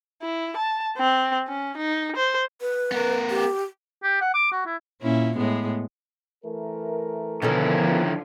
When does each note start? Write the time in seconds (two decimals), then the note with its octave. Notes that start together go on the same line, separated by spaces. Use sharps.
0.22 E4
0.57 A5
0.97 C4
1.47 C#4
1.77 D#4
2.16 C5
2.61 B4
2.92 B3 A#4
3.30 G4
4.03 G4
4.21 F#5
4.34 D6
4.52 F#4
4.66 E4
5.02 A#2 C#4 E4
5.37 A2 G#3 B3
6.45 E3 A3 A#4
7.42 B2 D3 D#3 F3 B3 C#4 E4 A4